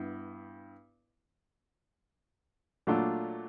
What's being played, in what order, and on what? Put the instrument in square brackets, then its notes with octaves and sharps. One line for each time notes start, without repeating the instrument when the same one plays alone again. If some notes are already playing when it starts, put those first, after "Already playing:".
Already playing: [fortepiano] G2 B3 E4
A#2 F#3 A3 D4 F4